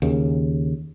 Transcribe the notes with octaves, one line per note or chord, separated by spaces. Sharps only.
D#2 C#3